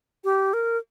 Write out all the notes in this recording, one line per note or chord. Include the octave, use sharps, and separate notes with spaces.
G4
A#4